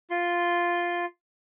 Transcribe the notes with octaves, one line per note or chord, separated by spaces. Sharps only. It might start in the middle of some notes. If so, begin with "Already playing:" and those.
F4 C6